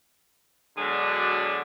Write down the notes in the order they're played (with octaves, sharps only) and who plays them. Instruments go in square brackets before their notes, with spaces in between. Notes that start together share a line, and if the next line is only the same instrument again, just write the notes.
[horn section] B2 D3 F#3 G#3 D4